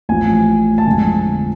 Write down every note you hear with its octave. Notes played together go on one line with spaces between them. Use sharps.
A1 A2 F3 G#5
A5
F2 D3 F3 G#3 G#5